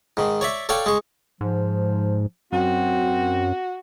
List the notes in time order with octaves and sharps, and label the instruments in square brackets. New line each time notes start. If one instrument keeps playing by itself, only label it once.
[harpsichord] G#2 D#3
C#5 D5 E5
A4 C#5 D5 F5 G5
G#3 C#6
[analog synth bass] G#2 [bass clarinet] F3
[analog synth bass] F#2 [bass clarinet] C4 [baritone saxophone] F#4